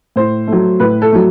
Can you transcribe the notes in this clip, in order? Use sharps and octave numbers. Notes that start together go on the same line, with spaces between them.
A2 C5
A3
F#3
A2 B4
A4
F#3 A3